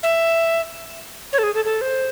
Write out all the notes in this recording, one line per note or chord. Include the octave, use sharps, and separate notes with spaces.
E5
C#5
A4
G#4
A4
A4
C5